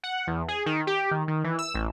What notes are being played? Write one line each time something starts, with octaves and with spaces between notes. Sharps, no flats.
F#5
E2
G#4
D#3
G4
D#3
D#3
E3
E6
A1